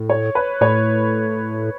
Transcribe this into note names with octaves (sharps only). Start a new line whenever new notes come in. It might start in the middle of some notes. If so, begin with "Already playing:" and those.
Already playing: A2
C#5
B4
A2 C#5